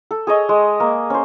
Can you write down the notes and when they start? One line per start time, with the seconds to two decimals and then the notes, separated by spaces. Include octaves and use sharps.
0.11 A4
0.27 G#4 C#5 D#5
0.49 G#3
0.80 A#3
1.10 C#4 C5